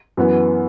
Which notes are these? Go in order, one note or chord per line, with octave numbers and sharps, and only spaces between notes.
F#2 E3 B3